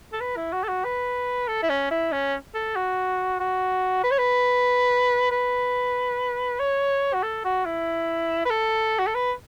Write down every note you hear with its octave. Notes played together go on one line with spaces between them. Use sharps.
A4
B4
E4
F#4
A4
F#4
B4
A4
E4
C#4
E4
C#4
A4
F#4
F#4
B4
C#5
B4
B4
C#5
F#4
A4
F#4
E4
B4
A4
F#4
A4
B4